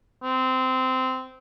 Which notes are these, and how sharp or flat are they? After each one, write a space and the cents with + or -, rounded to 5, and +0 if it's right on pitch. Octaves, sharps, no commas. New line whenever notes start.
C4 -15